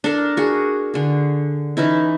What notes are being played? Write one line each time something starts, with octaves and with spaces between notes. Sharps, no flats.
D4 A4 A#4
F#4 G#4
D3 G#4
E3 C#4 D#4 E4